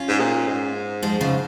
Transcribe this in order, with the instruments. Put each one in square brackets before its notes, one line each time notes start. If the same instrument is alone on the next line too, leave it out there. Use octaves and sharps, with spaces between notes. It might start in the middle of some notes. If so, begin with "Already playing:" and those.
Already playing: [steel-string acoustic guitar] C#4 F4
[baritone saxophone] G#2
A#2
G#2
[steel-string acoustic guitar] F3 G#3
C#3 F3